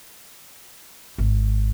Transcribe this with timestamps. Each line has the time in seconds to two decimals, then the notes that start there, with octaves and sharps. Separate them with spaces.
1.18 G#1